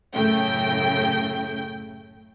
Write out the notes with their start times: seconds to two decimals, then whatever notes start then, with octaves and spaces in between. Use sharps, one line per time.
0.15 F#2 A2 C#3 A3 G5 G6